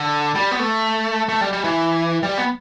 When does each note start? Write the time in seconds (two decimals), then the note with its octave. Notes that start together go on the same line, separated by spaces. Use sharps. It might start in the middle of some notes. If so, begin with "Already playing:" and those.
Already playing: D3
0.35 G3
0.51 B3
0.59 A3
1.29 A3
1.41 G3
1.53 G3
1.64 E3
2.23 G3
2.38 B3